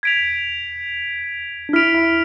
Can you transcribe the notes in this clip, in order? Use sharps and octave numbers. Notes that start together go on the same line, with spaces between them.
G#6 B6 D7 F7
D4
E4 F6 B6 D7 F7
E4